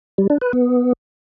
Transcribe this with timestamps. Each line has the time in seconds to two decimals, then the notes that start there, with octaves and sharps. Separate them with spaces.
0.18 G3
0.30 D4
0.41 B4
0.53 B3